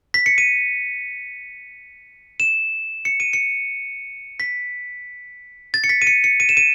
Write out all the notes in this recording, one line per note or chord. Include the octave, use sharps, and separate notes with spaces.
B6
C#7
D#7
E7
C#7
D#7
C#7
B6
A6
C#7
B6
D#7
C#7
C#7
D#7
E7
D#7